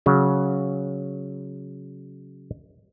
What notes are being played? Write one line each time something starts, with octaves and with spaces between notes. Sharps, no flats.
C#3 F#3